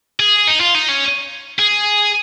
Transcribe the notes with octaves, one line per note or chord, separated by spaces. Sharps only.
G#4
D#4
F4
D#4
C#4
G#4